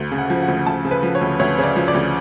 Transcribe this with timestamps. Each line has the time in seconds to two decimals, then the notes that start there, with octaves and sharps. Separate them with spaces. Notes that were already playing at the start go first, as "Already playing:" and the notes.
Already playing: D2
0.11 C#3
0.18 F#5
0.30 F3
0.42 F#5
0.48 D2
0.66 D2 A5
0.85 C#3
0.91 B4
1.03 F3
1.15 C#5
1.21 D2
1.39 D2 C#5
1.58 C#3 C#5
1.63 D5
1.76 F3
1.88 D5
1.94 D2